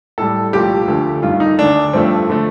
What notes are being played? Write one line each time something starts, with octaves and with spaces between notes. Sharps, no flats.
A2 G3 A4
C2 A#2 F3 A3 G4
D2 D3 F3 A3
G2 D#3 A3 F4
D#4
D2 D3 A3 D4
G2 F3 A3 C4
D3 F3 A3